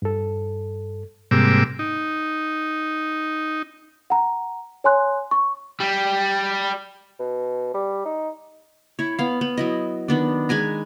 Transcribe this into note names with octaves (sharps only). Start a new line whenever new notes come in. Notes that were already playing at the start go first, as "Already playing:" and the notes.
G2 A4
G#2 C3 G3 A#3 D6 E6
D#4
F#5 A#5
C#5 G#5 C6 F#6
C#6
G3
B2
G3
D#4
E4 C#5
B3 F5
B3
F#3 E4 D#5
D#3 B3 D4
G#3 B4 G#5 A#5